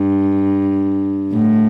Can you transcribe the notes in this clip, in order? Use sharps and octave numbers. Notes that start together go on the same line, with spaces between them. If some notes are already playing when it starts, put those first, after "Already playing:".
Already playing: G2
A2